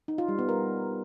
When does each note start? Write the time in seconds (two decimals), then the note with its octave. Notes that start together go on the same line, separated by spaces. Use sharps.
0.08 D#4
0.18 F4
0.28 G3
0.39 B3
0.49 A#4